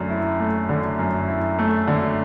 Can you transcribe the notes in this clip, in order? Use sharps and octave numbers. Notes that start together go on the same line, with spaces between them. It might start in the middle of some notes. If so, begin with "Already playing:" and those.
Already playing: F#2 D3 A3
E4
A3
D3
F#2
E4
A3
D3